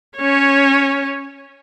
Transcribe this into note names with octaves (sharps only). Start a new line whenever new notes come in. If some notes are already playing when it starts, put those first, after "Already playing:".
C#4 C#5